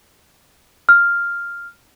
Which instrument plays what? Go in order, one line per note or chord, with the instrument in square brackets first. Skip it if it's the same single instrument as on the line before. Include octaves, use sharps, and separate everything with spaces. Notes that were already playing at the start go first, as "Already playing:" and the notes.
[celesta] F6